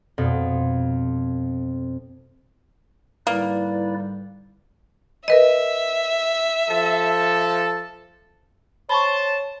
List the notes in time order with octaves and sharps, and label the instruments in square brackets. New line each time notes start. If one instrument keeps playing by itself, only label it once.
[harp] F2 B2
[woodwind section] G#2 D3 G3 [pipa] A#3 [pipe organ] E4 B4 D5
[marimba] A#4 B4 D#5 [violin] E5
[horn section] F3 A4
[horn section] C5 A5 [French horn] C#5 [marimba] B5 C#6